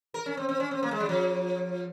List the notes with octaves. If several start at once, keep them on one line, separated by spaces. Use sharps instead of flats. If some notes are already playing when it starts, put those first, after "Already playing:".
A#4
C#4
C4
C4
C#4
C4
A#3
G#3
F#3
F3